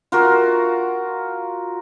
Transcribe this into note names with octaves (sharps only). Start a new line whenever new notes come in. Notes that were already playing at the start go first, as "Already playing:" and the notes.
F4 F#4 A#4